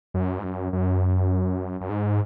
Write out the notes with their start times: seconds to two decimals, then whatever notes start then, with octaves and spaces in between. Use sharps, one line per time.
0.14 F#2
0.39 G#2
0.44 F#2
0.73 F#2
1.81 F#2
1.90 G#2